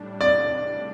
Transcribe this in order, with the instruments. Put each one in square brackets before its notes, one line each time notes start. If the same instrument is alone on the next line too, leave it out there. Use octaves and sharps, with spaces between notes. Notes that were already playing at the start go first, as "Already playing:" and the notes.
Already playing: [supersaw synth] A2 G3 D4
[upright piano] D5